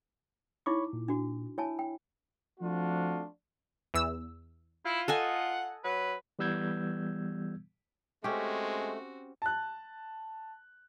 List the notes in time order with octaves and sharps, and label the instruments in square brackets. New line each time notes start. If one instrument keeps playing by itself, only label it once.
[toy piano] D#4 E4 D6 [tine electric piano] C#5 B5 C#6
[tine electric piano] A#2
[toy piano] D4 F#4
[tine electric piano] E4 [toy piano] C#5 G#5 A5
[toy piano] G5
[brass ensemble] F3 A3 C4 D4 F4 F#4
[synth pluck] E2 E6
[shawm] E4 [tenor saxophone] F4
[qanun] A4 D#5 G#5 [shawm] F#5
[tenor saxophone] F#3 [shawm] B4
[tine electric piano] E3 G3 B3 E6 G6 G#6
[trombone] G#3 [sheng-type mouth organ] A3 [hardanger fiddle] C4 F#4 [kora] C#4 G4
[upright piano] A5 F#6